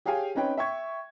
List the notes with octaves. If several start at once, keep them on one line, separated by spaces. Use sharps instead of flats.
G4 G#4 C#5 F5 G5 G#5
C4 C#4 D#4 B4 C#5 G5
E5 G5 C#6 G#6